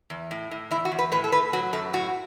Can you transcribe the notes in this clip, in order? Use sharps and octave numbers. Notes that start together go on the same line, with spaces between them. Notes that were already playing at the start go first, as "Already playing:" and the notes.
E2
A2
A2
E2 E4
F#4
E2
B4
A2 B4
A4
A2 B4
F#3 F#4
F#2 A4
A2 F#4